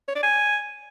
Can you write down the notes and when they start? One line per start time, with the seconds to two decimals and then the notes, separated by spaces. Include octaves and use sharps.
0.08 C#5
0.16 D5
0.23 G#5